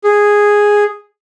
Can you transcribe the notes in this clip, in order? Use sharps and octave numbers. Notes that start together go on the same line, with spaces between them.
G#4